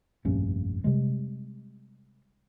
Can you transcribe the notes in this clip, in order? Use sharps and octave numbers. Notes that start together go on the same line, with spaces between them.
F1 A#1 G2 C#4
C3 G3 G#3